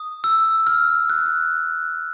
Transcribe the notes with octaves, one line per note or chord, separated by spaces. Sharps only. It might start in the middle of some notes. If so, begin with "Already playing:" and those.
Already playing: D#6
E6
F6
F#6